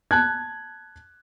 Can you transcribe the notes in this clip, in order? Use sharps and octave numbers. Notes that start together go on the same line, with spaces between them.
A5 F#6 G#6